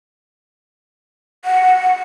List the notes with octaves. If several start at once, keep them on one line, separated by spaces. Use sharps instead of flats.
F#5